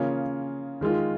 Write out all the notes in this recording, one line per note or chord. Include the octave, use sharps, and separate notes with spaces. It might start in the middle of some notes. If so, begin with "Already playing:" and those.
Already playing: C#3 A#3 C#4 F4 G#4
D#3 G#3 F4